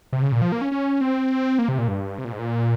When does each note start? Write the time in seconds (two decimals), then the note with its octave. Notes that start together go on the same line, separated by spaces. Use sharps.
0.13 C3
0.22 C#3
0.32 A#2
0.42 F3
0.52 A#3
0.61 C#4
0.72 C#4
1.01 C4
1.59 A#3
1.69 C3
1.78 A#2
1.88 G2
2.18 C3
2.25 A#2
2.32 G#2
2.39 A#2